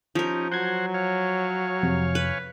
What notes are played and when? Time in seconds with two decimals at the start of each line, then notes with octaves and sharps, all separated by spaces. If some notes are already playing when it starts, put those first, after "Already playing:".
0.15 F3 C#4 D#4 G4 A#4
0.52 F#3 F#4 C5 F#5 G6 G#6
0.94 C#5 F5 G#5
1.83 F2 C3
2.15 B4